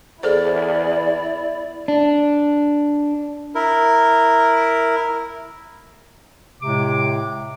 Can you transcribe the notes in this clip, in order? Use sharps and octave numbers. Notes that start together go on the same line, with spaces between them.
E2 E4 G#4 A4 C5 D5
D4
E4 A#4
A2 C3 G#3 D6